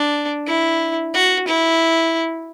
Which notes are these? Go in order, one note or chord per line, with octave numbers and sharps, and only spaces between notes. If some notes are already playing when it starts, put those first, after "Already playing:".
Already playing: D4
E4
F#4
E4